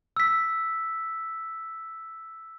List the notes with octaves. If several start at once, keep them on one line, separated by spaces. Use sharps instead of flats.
E6 B6